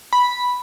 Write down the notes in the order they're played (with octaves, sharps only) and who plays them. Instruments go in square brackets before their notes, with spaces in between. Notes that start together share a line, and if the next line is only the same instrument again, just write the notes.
[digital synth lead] B5